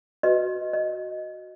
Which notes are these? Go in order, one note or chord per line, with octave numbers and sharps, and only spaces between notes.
F#4 B4 D#5
D#5